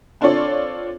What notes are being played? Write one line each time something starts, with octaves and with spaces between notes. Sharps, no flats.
C4 D4 F4 A4 C#5 D5